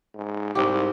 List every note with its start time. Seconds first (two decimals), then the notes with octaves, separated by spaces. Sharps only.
0.15 G#2
0.55 C2 G#2 G4